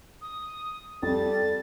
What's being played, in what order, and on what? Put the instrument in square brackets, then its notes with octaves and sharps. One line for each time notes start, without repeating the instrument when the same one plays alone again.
[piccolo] D#6
[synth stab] F2 [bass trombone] G3 [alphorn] A4 [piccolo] A6